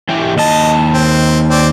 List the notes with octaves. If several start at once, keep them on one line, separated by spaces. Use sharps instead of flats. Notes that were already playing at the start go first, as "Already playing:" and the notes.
E3 G4
D#2 D#5 A5
C4
C4 D5